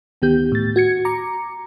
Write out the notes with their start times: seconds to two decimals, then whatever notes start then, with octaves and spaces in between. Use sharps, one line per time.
0.22 D2 D#3 B3 G4 G6
0.52 A2 A6
0.76 F#4 G#6 C#7
1.05 A#5 D6 C#7